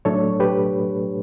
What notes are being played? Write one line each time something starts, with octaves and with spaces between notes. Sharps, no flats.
A2 F#3 A3 D4 A4 C#5
G4 B4